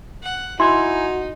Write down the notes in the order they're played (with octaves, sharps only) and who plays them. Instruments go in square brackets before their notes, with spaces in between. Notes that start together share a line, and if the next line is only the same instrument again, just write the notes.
[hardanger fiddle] F#5
[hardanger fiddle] D#4 [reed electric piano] E4 G#5 G#6 [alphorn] F#4 [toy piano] C6